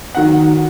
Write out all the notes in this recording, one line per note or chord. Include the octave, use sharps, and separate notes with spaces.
D#3 F#3 F#5